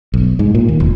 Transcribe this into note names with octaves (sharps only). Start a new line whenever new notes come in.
B1
G#2
A#2
D#2
F1